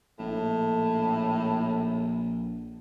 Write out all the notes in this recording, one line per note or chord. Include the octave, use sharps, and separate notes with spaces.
A#1 A2